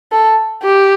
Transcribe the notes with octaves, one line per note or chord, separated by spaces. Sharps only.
A4
G4